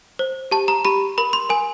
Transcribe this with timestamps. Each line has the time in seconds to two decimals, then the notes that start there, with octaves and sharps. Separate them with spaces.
0.19 C5
0.51 G4 A5
0.68 A#5
0.85 G4 B5
1.18 A#4 B5
1.33 C6
1.50 A#4 G#5